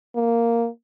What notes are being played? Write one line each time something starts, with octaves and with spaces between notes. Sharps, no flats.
A#3